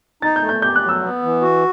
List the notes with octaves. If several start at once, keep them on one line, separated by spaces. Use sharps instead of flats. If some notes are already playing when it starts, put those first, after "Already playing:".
D#4 A6
G6
A3
G6
G4 G6
F#6
F#3
E6
B3
E3
F#4